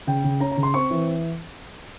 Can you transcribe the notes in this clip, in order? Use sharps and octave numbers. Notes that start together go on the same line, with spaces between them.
C#3 G5
C#3
C#4 A#5
A#5
C#3
C6
C4 C#6
E3